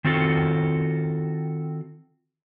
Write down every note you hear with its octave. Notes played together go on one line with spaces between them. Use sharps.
D#3 C4 F4 F#4 A4